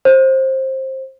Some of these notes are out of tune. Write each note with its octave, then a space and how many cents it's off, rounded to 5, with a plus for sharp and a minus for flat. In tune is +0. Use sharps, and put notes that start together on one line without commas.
C5 +20